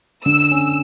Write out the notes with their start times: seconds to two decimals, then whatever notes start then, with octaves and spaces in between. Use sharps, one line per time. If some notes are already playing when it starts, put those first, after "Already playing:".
0.25 D3 E6
0.51 C#4